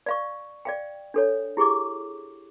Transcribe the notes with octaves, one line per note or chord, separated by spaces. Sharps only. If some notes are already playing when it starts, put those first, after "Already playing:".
D5 F5 C#6
D5 F5 G5
D4 A4 C#5
E4 G4 G#4 C#6 D6